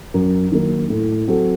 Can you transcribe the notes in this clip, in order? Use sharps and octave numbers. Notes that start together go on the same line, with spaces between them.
F#2
D#3 F#3 A#3
A2
F#3 C4 F#4 A4